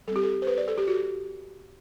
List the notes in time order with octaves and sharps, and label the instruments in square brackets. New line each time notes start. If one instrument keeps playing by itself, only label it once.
[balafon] G3 A4
C4 G4
A4
C5
B4
D5
A4
G4
F#4